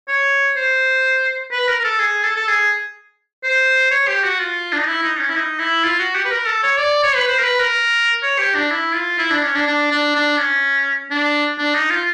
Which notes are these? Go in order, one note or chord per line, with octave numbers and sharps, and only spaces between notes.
C#5
C5
B4
A#4
A#4
A4
G#4
A4
A4
G#4
C5
C#5
G4
F#4
F4
D4
D#4
E4
D#4
C#4
E4
D#4
E4
F4
F#4
G4
B4
A#4
A4
C#5
D5
C#5
B4
C5
A#4
B4
A#4
C#5
G4
D4
E4
F4
E4
D4
C#4
D4
D4
D4
D4
C#4
D4
D4
D#4
F4